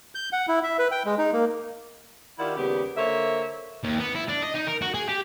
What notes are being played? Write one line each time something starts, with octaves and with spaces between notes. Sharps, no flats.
G6
F#5
E4
E5
B4
G5
G#3
D#4
A#3
D#3 E4 F4 G4 D5 F#5
D#2 C#3 G3 B3 G4
D3 A#3 C5 C#5 E5
D#2
B3
E4
D4
D#5
D#4
A#4
F#4
G#4
G4